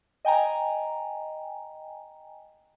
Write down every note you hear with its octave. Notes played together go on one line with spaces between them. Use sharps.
D#5 G5 G#5 A#5